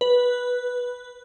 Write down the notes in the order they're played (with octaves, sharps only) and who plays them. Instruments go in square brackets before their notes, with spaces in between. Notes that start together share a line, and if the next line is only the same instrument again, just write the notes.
[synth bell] B4